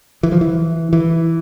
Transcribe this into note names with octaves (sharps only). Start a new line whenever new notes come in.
E3
F3
E3
E3